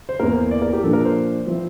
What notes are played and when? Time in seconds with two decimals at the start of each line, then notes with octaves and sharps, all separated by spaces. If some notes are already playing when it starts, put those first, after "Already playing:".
0.09 C5
0.19 E2 E3 A#3 A#4
0.36 C5
0.51 D5
0.62 A#4
0.73 G4
0.83 A#2 F3 A#3 D4 A4
0.93 A#4
1.05 C5
1.47 F3 C4 E4